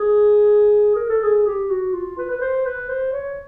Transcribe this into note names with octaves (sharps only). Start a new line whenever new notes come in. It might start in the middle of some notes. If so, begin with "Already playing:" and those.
Already playing: G#4
A#4
A4
G#4
G4
F#4
F4
B4
B4
C5
B4
C5
C#5